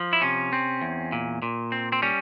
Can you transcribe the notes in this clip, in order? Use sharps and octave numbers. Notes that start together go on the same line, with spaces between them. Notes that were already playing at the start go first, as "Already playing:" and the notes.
Already playing: F3
E4
C3 C#4
C4
E2
A#2
A#2
C4
C4
G3 C#4